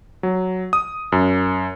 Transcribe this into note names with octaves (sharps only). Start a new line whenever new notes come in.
F#3
D#6
F#2